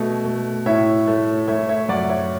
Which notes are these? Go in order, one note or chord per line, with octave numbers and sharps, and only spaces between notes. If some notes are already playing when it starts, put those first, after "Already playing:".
Already playing: B2 A3
A3
A2 C#5 E5
A3
A3 C#5 E5
C#5 E5
F#2 D5 F#5
C#5 E5